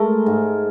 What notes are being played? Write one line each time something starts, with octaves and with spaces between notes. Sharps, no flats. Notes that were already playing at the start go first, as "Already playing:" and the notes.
Already playing: G#3 A3 A#4
G#2